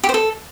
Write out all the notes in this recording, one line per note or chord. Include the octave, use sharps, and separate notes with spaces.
G4
C5
A4